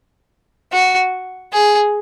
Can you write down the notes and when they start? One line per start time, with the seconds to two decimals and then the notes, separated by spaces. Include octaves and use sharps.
0.72 F#4
1.53 G#4